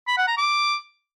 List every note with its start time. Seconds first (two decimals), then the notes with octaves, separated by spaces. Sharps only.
0.07 B5
0.17 F#5
0.27 A#5
0.38 D6